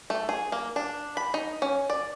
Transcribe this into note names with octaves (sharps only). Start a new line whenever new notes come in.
A3
G#4
A#3
D4
B5
D#4
C#4
D5